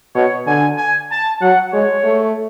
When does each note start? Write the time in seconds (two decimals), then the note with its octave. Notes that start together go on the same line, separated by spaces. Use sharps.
0.15 B2 C#5
0.47 D3 G#5
0.78 G#5
1.10 A5
1.42 F#3 F#5
1.73 G#3 C#5
2.04 A3